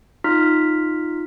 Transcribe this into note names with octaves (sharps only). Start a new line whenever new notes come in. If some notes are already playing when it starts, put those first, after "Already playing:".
D#4 F4 F6 B6